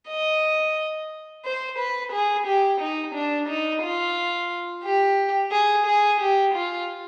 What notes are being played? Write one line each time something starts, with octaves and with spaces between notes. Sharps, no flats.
D#5
C5
B4
G#4
G4
D#4
D4
D#4
F4
G4
G#4
G#4
G4
F4